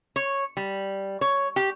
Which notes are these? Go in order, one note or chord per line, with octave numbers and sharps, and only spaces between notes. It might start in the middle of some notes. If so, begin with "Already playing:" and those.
C#5
G3
C#5
G4